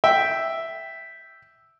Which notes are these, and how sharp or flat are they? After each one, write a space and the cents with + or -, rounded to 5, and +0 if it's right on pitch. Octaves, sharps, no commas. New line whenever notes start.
E5 +0 G5 +0